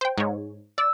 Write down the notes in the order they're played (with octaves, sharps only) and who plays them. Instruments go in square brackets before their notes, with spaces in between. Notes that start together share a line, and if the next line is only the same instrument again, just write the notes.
[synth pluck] C5 G5
G#2 C#5
[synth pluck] D5 [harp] E6